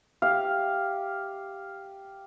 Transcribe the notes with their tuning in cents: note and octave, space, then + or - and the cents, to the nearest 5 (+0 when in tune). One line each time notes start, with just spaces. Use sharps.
G4 +0 F5 +0